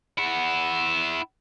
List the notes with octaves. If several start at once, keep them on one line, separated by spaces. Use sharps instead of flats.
E4 F#5